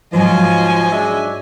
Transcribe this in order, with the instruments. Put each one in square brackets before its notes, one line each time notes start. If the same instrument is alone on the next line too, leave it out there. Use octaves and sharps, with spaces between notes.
[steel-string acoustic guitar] G#2 F#3 [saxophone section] F3 [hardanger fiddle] D#5 G#5
[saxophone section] G#3 D4 E5